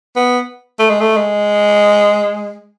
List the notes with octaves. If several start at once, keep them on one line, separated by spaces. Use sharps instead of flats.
B3
A3
G#3
A3
G#3